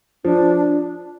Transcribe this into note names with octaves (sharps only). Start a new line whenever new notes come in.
F3 D4